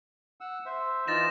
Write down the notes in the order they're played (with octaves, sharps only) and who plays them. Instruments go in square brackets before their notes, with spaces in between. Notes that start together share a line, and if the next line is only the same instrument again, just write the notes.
[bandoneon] F#5 E6
C5 E5
[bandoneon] E3 D#4 F4 [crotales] A6 A#6 E7